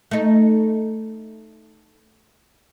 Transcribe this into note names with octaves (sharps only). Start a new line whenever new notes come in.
A3 D#4